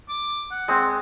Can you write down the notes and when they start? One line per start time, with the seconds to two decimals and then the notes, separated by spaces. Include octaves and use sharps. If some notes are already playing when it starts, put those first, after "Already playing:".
0.09 D6
0.51 F#5
0.68 G#3 C4